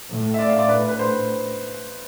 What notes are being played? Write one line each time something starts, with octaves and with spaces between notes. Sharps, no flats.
A2
E5
D5
F5
D5
A2 B4
B4
C5